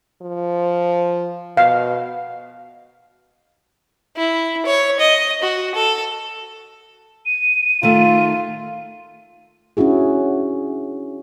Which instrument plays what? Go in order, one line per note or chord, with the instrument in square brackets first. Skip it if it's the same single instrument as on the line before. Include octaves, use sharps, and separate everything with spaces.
[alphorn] F3
[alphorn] B2 [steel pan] F5
[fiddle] E4
C#5
D#5
F#4
A4
[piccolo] D#7
[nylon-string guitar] D#3 A3 [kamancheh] F4
[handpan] C#4 D4 E4 F#4 G#4